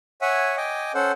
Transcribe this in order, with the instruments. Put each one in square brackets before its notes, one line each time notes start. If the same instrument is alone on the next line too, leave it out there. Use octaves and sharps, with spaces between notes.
[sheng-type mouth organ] C#5 E5 F#5 G#5
D#5 G5 G#5 D6
C#4 A4 C5 F#5